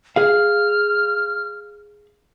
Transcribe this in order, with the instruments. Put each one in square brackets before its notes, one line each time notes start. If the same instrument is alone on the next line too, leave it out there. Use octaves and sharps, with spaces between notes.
[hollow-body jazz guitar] G#4 F5 [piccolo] F6